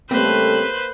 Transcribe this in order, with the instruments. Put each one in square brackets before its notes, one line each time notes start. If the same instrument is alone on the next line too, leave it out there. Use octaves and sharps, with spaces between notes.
[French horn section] C#3 G3 A3 [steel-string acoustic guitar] A#3 [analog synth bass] C4 [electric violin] B4 C5